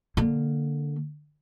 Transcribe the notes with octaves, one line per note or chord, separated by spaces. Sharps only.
D3 A#3